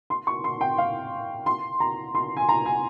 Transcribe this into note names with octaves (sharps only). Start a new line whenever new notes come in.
C6
C#6
C6
G5
F5
C6
A#5
C6
G#5
A#5
G#5